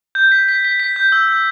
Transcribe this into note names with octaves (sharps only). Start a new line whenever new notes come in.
G6
B6
B6
B6
B6
G6
E6
E6